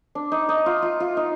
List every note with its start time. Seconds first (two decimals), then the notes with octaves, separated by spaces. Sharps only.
0.15 D4
0.32 D#4
0.49 D#4
0.66 F4
0.82 F4
1.00 F4
1.17 D#4